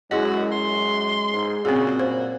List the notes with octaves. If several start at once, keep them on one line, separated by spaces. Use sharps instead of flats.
F#2 G#3 E4 F#4 G#4 D#5
F#2 C6
G#2
A#2 C#3 C4 F#4 G#4
F#2 C5